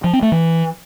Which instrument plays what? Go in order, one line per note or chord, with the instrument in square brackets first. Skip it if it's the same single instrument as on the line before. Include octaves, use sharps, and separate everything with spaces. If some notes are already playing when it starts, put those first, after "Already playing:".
[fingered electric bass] F3
C4
A3
E3